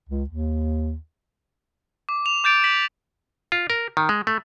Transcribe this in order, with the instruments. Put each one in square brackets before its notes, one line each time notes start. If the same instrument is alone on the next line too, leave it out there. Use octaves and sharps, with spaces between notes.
[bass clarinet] C#2
D#2
[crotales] D6
F7
D6 G6 A6 D7 F7
B6 F#7
[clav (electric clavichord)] F4
A#4
D#3
G#3
A3